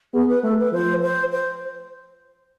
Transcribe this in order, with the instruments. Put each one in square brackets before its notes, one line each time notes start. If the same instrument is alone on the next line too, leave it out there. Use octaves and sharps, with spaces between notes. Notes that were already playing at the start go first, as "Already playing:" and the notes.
[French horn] B3 [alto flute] G#4
[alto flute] B4
[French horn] A3 [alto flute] A4
[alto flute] B4
[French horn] F3 [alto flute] C5
[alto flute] C5
C5